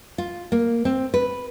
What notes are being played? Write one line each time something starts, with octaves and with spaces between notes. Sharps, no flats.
F4
A#3
C4
B4